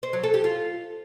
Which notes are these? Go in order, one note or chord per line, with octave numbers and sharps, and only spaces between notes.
C5
F#3
A4
G4
F4